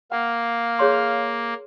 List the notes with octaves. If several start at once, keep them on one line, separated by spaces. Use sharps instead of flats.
A#3 F5 F#5
G#4 C#5 C6